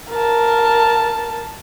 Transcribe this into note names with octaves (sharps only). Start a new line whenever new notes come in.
A#4 A5